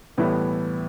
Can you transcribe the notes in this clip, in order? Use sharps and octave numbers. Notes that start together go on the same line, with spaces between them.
A2 E3 G3 B3 E4